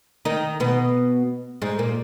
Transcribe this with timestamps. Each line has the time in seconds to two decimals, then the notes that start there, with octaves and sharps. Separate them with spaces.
0.25 D#3 D#4
0.60 B2 B3
1.62 G#2 G#3
1.79 A#2 A#3